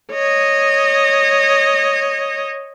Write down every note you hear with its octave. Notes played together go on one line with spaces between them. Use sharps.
C#5 D#5